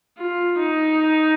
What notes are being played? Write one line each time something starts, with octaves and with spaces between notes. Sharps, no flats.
F4
D#4